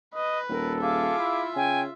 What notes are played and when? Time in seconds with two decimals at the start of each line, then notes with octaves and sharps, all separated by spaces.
0.15 B4 D#5
0.49 D#1 A4 A#4
0.81 F4 G#4 E5 F5 D6
1.19 E4
1.56 C#3 G5 G#5